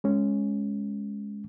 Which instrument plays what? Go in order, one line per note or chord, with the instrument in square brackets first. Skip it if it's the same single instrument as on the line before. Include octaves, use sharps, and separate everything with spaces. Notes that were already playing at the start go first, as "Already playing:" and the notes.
[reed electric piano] G#3 C#4